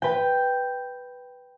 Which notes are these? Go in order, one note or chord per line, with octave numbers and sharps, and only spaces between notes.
B4 G5